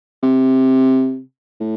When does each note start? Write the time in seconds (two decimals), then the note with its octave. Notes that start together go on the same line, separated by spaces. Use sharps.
0.23 C3
1.61 A2